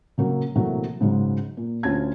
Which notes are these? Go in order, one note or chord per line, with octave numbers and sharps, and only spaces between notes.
C#3 F#3 A#3
C3 E3 F#3 A3 A#3
G#2 C#3 F#3 G#3
A#2
D2 D3 C#4 F4 A5 G#6